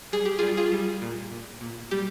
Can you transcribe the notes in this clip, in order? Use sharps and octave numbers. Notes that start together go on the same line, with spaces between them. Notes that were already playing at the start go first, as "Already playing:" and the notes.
G3 G#4
G4
G3 F4 G#4
F4 G#4
G3
A#2
A#2
A#2
G3 G4